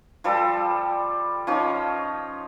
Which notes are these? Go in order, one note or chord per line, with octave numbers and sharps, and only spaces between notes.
F3 G3 A4
F3 C#4 D#4